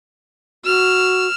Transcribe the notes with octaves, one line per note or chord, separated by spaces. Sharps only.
F#4 E6 F6